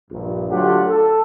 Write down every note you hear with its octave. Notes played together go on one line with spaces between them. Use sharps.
A#1 G2
D3 F#3 A3 F4 G4 F#5
A4